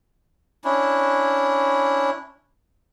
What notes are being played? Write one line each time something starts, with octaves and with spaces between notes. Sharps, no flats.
C#4 D4 E4